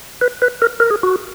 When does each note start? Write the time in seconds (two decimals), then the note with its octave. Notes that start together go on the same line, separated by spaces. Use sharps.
0.21 B4
0.42 B4
0.62 A#4
0.80 A#4
0.91 G#4
1.03 F#4